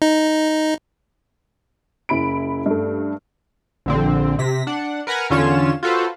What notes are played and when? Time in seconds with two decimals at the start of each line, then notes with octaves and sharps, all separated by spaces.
0.02 D#4
2.09 F#1 E4 B5 D7
2.66 G2 A3
3.86 A#1 D3 C4
4.39 C3 A#6 B6
4.67 D4 F#5
5.07 A#4 B4 F#5 G#5 A#5
5.30 E2 D3 C#4 F4 C#5 E7
5.83 F4 F#4 A4 B4 C5